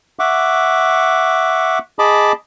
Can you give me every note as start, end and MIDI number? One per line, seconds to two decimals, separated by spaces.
0.19 1.79 76
0.19 1.79 78
0.19 1.79 85
0.19 1.79 86
1.99 2.32 68
1.99 2.32 75
1.99 2.32 81
1.99 2.32 83
1.99 2.32 86